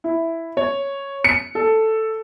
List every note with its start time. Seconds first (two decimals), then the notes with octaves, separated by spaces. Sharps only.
0.04 E4
0.57 C#5
1.24 C#7
1.55 A4